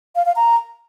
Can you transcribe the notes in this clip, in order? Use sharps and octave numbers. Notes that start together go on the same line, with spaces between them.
F5
F5
A#5